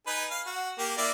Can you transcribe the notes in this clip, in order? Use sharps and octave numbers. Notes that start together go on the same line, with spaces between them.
D#4 G#4 B4
F5
F#4
A#3 G4
A#3 E4 D5